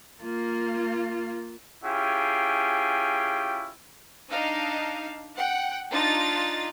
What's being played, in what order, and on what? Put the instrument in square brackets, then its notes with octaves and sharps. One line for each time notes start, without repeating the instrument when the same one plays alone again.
[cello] A#3 F4
[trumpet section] C#4 E4 F4 G4 G#4 G5
[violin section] D4 D#4 F5
F#5 G5
D4 D#4 F4 A6